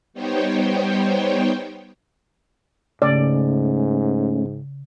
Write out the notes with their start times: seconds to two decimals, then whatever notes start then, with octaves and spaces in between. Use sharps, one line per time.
0.14 G3 B3 D#4 C5 C#5 G5
3.02 G#2 C#3 A3 C#4 D5